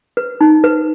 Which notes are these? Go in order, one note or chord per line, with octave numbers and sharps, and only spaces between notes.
B4
D#4
B4